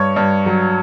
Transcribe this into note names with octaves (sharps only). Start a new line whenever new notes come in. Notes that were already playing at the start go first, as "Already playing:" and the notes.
Already playing: G2 C#5
G2
F#3